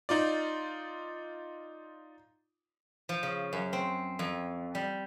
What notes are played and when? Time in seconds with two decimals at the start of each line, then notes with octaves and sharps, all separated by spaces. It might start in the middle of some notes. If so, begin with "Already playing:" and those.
0.09 D#4 F4 D5
3.09 F3
3.23 C#3
3.53 F#2
3.73 C4
4.19 F2
4.75 G3